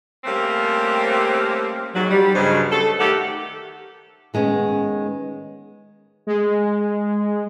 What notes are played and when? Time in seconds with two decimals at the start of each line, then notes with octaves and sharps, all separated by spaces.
0.25 G3 A3 A#3 C4 C#4 G4
1.94 G#2 F#3
2.10 G3
2.35 G2 C#3 F#3 G#3 C5
2.71 A4
2.99 D#3 A3 G4 A4 F#5
4.34 D#3 G#3 B3 C#4
6.27 G#3